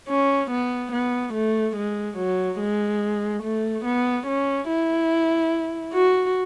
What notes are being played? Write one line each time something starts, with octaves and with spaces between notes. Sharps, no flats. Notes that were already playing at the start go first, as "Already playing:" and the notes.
C#4
B3
B3
A3
G#3
F#3
G#3
A3
B3
C#4
E4
F#4